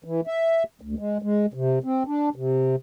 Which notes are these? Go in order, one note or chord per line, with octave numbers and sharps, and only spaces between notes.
E3
E5
D2
G#3
G#3
C3
C4
D4
C3